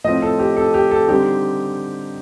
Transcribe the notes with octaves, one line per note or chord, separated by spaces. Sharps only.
A2 F3 C4 D#5
A4
G4
A4
G4
A4
D3 G3 C4 D#4 G4